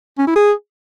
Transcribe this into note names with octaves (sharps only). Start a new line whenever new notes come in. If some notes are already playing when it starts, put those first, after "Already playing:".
C#4
E4
G#4